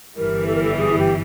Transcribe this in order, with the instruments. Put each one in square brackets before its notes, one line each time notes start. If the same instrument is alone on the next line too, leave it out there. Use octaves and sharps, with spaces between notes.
[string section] G1 G2 E3 G3 [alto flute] A#4
[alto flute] A4
A#4
A4
G#4
G4